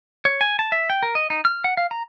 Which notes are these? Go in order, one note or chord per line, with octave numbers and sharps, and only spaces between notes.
C#5
G#5
A5
E5
G5
A#4
D#5
D#4
F6
F#5
F5
A#5